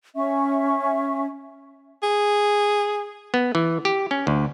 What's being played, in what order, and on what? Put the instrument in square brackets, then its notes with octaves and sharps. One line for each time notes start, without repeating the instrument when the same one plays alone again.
[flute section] C#4 E5 C#6
[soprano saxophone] G#4
[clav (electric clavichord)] B3
E3
G4
C#4
D2